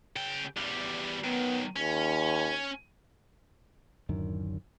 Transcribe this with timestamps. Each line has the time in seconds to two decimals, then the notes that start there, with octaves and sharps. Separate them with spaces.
0.16 C#3 G5
0.57 E2 G3
1.24 B1 D#3 B3
1.76 D#2 C#4
4.09 D1 F#2 D3 D#3